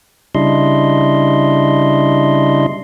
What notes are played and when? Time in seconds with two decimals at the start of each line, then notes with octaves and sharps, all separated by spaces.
0.35 C#3 G3 D4 E4 D#5 C6